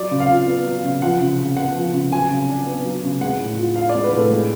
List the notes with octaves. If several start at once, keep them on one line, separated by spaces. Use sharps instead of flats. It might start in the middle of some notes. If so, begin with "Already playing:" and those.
Already playing: F#3 D5
C#3
F5
F4
B3
F#3
C#3
F3 F#5
C#3
C#3
B3 F#5
F3
C#3
F#3 G#5
C#3
D4
B3
F#3
C#3
G#3 F#5
A2
F4
D4 F5
D5
G#3
B4
A2 A4
G#3